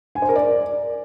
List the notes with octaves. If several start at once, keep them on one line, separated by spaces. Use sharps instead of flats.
G#5
C5
A#4
D5